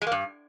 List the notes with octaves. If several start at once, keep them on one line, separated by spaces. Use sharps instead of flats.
G#3
A#3
G2